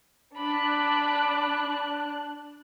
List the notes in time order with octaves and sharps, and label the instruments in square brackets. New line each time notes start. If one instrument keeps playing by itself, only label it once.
[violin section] D4 F#6 [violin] B5 D6